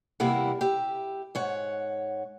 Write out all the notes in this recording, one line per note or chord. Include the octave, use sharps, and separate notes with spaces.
E2 C3 G3 A#3 E4 F#5
G4 E5
G#2 C#5 F#5